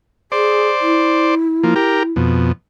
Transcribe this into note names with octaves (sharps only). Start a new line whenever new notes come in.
G#4 C5 D5
E4
F3 A#3
G4 A#4
F2 B2